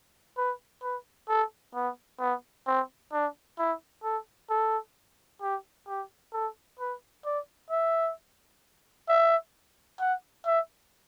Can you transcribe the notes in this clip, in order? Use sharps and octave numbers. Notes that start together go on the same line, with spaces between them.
B4
B4
A4
B3
B3
C4
D4
E4
A4
A4
G4
G4
A4
B4
D5
E5
E5
F#5
E5